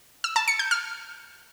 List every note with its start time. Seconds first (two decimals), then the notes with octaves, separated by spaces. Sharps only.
0.24 E6
0.36 A5
0.48 C#7
0.59 G6
0.71 F6